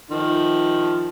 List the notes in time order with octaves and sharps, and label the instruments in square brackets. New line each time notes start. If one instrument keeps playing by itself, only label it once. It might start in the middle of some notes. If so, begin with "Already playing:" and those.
[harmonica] D#3 F3